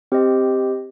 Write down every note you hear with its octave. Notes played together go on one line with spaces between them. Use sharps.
C4 G4 C5 D#5